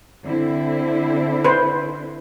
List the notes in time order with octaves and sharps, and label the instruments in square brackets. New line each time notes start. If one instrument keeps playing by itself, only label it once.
[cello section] D3 C4 E4
[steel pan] B4 C5